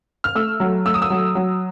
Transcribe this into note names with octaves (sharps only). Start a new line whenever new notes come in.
F6
A3 E6
F#3
A3 E6
D#6
E6
F#3
F#3